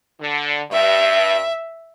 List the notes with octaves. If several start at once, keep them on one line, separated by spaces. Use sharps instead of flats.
D3
G2 E5